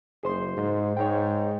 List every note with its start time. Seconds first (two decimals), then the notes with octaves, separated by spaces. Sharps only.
0.23 F#1 G#4 C5 C6
0.57 G#2
0.97 G#2 C#5 G5